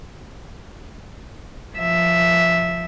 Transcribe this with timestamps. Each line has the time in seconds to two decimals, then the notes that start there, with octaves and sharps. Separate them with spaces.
1.77 F3 E5